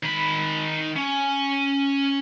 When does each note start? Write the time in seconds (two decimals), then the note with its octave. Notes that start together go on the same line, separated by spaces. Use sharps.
0.03 D#3 B5
0.96 C#4